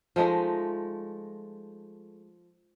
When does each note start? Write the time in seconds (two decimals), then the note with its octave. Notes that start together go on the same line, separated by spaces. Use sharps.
0.16 F3 G#3 A3 D#4